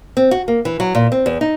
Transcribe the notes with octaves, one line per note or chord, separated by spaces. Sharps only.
C4
F#4
A#3
E3
F#3
A#2
C4
E2
D#4